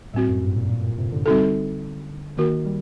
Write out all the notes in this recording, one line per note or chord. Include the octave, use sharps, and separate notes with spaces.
A2 G3 C4 F#4
F#2
G2
A#2
A#2
A#2
C3
D3
G3 C4 D#4 F#4 A4
D#3 A#3 F#4 A#4
G3